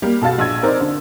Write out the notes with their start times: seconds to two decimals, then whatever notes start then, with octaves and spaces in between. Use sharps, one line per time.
0.02 G3 A#3 G4
0.22 B2 A4 F5 A5 A6
0.39 A#1 E6 G#6
0.63 C4 D#4 A#4 C5 D5
0.80 D3